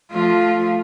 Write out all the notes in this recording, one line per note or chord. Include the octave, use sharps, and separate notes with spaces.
F3 A3 F4